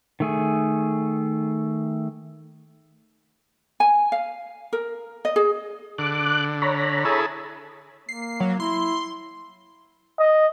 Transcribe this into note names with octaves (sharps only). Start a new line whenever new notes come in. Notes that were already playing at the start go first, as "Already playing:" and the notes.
D#3 A3 G#4
G#5
F5
A#4
D#5
G#4
D3 D6 F#6
C#5 A#5 B5
E4 G#4 A4
A#3 C7
F#3
E4 C6
D#5